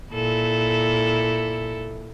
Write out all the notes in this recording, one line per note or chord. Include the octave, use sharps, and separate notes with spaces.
A#2 E4 A4